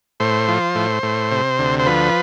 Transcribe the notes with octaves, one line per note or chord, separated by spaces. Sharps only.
A2 C5
F3
A2
A2
C3
D2
C5
F3 B4